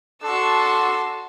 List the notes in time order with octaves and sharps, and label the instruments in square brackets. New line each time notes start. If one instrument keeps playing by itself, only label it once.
[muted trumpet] D4 [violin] F#4 E6 [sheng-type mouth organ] A4 [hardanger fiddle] A5 C6